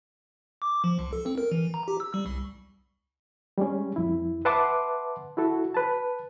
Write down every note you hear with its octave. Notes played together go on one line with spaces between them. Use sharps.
D6
F3
C#2
A4
C4
A#4
E3
A#5
G4
E6
G3
C2
G3 G#3 C#4
F2 E4
B4 E5 F#5 A5 C6 D6
E4 F#4 A4
B4 A5